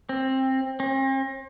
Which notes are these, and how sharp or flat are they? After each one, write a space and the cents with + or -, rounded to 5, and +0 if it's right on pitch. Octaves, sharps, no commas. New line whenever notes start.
C4 +15
C4 +45